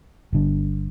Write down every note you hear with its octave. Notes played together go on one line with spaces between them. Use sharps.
G1 G2 D3